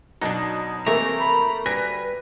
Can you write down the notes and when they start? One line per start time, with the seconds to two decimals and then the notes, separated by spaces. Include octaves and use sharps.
0.21 B2 F#3 D4 D#4
0.86 C3 E3 A3 A#3 G#5 A#5
1.20 B5
1.66 D2 G3 B4 G#5 A#6